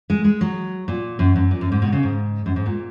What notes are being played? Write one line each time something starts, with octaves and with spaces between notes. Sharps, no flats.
G#3
G#3
F#3
A#2
F#2
F#2
A#2
F#2
G#2
B2
C#3
G#2
F#2
G#2
A#2